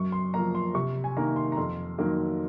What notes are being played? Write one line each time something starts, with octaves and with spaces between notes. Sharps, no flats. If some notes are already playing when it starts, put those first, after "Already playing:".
Already playing: F#2 C#6
C6
F3 A#3 A#5
C6
C3 C#6
G#5
D#3 A#3 A#5
C6
A#5
F2 C6
D#3 F#3 A#3